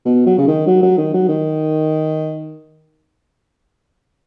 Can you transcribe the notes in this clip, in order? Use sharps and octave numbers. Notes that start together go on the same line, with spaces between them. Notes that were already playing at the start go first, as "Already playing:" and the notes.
B2
F#3
C#3
D#3
F#3
F#3
D#3
F#3
D#3